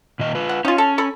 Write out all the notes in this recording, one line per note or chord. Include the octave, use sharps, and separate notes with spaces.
A#2 D#3 D#5
F4 B4
F#5
C#4 D#4 F4
A4
A4 B5